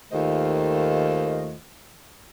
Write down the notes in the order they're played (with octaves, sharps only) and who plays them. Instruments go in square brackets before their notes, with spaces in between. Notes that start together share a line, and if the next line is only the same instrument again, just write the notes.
[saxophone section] D#2 D#3 A3 F4 C5 D#5